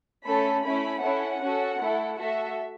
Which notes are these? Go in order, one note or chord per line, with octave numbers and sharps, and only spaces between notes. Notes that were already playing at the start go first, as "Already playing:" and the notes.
A3 C#4 A4 B5
A3 C#4 E4 B5
C#4 E4 A4 F#5
C#4 F#4 A4
A3 E4 A4
A3 F#4 A4 E5